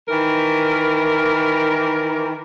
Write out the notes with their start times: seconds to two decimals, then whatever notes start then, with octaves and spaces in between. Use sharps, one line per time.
0.07 D#3 E3 A#4